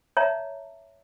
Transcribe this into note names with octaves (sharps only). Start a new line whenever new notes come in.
C#5 D5 E5 A5 A#5